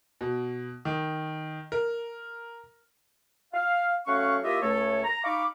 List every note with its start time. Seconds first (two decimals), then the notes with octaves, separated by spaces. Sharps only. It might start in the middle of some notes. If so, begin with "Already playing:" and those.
0.21 B2
0.85 D#3
1.72 A#4
3.54 F5
4.07 F#3 A3 C#4 F5 F#5 C#6
4.43 A#3 E4 F4 G4 D#5 E5
4.62 C#2 A3 A4 C#5
5.04 A#5
5.25 D#4 F5 B5 C#6 D6